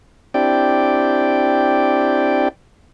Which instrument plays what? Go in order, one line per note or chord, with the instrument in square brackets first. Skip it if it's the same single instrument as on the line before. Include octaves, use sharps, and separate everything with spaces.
[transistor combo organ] C4 D4 E4 G4 D5 G5